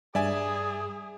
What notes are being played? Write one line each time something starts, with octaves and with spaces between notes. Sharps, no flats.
G2 G#4 D5 E5 G#5